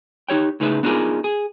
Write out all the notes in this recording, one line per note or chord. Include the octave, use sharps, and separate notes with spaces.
D#4 G4 C#5 G5
A2 C#3 D#4 G#4 B4 E5
B3 D4 D#4 F4 G#4 A#4
G#4